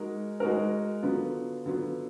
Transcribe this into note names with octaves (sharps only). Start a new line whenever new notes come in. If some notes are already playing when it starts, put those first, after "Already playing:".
Already playing: G#3 D#4 F#4 A#4
G#3 D#4 F#4 A#4
D3 F#3 B3 F4
D3 F#3 B3 F4